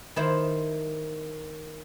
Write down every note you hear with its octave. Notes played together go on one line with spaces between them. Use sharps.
D#3 E4 C5